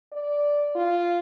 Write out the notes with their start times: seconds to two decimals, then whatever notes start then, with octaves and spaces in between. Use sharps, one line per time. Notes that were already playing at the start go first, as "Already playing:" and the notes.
0.12 D5
0.75 F4